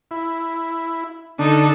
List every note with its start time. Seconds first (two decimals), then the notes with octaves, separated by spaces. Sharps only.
0.11 E4
1.39 D3 D4 D#4 A4